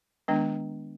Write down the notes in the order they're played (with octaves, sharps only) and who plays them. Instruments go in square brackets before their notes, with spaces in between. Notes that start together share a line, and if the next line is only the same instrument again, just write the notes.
[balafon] D#3 G#3 B3 D4